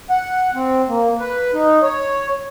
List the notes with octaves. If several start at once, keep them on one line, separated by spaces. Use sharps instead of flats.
F#5
C4
A#3
B4
D#4
C#5